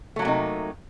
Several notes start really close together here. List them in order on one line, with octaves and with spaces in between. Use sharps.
A3 F#3 A#3 C3 D#4